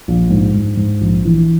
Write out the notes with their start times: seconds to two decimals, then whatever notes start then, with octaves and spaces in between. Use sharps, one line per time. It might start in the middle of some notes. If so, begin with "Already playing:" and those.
0.08 A#1
0.30 G#2
0.54 G#2
0.77 G#2
1.01 A#1
1.25 E3